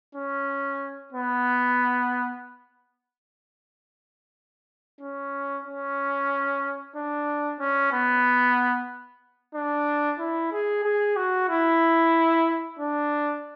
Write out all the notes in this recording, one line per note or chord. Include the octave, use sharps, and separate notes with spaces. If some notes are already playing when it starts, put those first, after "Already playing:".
C#4
B3
C#4
C#4
D4
C#4
B3
D4
E4
G#4
G#4
F#4
E4
D4